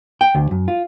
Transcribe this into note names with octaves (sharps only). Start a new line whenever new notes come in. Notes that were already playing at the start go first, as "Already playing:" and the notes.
G5
D2
F#2
F4